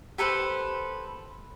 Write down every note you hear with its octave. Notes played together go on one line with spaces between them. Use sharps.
G4 A4 B4 C5